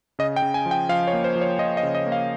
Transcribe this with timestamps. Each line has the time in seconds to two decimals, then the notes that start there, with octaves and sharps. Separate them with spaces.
0.19 C#3 D#5
0.36 G5
0.42 C#3
0.54 G#5
0.66 F3
0.71 G5
0.89 F3 F5
1.07 C#5
1.13 A#3
1.24 C5
1.35 F3
1.41 C#5
1.59 F3 D#5
1.77 D#5
1.83 C#3
1.95 D#5
2.06 A#3
2.12 F5